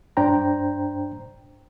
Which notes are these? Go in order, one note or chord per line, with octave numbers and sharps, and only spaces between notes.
G2 D4 C5 G5 A#5